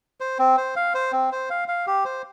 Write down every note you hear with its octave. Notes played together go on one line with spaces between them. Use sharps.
C5
C4
C5
F5
C5
C4
C5
F5
F5
G4
C5